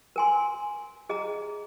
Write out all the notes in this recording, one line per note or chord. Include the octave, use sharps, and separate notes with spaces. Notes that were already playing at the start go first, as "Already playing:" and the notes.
A#4 G#5 C6
G#4 D#5 A#5